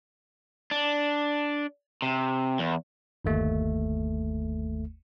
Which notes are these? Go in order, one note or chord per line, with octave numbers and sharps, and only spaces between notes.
D4
C3
E2
G1 D#2 A3